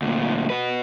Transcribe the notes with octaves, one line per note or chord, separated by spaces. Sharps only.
D2 A#2
F#4 B4